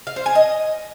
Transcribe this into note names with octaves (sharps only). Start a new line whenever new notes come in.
F5
C5
G#5
D#5